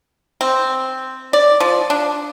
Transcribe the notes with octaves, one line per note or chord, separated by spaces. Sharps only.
C4
D5
F3
D4